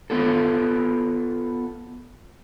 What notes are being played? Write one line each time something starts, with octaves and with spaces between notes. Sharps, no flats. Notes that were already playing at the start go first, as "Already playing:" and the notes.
B3 F4 A4